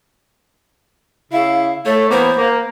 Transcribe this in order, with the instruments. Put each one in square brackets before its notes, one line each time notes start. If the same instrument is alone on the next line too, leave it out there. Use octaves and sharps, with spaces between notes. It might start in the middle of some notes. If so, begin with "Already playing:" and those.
[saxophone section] C#3 E4 [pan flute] F5
[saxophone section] A3 [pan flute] C#5
[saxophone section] E3 A#3 B3 [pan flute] C5
[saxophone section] A#3